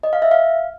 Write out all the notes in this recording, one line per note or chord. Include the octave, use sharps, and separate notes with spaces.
D#5
F5
E5
F5